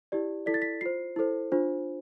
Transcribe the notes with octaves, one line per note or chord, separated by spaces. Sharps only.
E4 G4 D5
E4 A4 D5 B6
A6
B6
F4 C5 C7
E4 A4 C5
D4 F4 C5